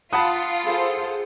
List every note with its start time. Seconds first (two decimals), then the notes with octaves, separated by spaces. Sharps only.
0.13 F4 F#5 A5 B5 D#6
0.64 G#4 A4 C5